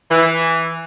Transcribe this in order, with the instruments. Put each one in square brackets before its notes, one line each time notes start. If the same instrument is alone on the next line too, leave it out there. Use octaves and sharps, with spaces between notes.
[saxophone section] E3